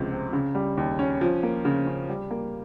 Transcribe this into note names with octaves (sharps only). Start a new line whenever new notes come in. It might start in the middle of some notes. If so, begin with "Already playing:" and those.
Already playing: C#2 C3 F3
C4
C#3
G3
D#2
C#4
F3
A#3
C#3
C#4
G3
A#3